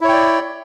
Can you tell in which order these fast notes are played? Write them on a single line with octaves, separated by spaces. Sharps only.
E4 C#5 G5 D5